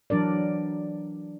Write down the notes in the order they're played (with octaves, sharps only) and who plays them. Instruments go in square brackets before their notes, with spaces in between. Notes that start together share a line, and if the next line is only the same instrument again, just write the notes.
[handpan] E3 F#3 D4 A#4 D5